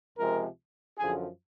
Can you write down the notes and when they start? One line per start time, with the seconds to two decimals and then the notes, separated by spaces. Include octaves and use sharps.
0.17 C#2 C3 F3 G#3 A#4
0.98 F#2 D3 F3 G#4